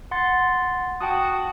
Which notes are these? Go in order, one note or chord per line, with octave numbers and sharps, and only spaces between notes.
F#5 C6 A6
F#4 G5 A5 D#6